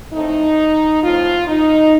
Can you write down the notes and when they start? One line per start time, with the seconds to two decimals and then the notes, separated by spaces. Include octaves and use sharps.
0.13 A2 A3 C4 D#4
1.02 A2 F3 C4 F4
1.47 D#4